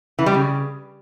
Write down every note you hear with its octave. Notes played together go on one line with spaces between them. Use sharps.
E3
G3
C#3